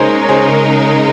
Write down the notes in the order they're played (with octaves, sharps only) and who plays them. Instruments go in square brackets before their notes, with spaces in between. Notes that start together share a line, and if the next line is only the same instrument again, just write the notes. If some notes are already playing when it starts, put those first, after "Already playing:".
Already playing: [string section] C#3 G#3 D#4 A#4 [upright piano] A#3 C#4 G#4 C5
[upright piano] C#5
G#4 C5